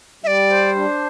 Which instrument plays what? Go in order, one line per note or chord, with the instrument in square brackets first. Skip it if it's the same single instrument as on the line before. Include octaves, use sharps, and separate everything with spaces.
[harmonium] G3 [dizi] E5
[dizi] D5
[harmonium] C5
D4